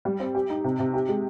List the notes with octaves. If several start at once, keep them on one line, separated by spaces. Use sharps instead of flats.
G3
C4
G4
D#4
C3
C3
G4
G#3